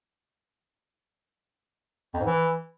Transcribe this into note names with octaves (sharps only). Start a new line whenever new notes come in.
F2
G#2
E3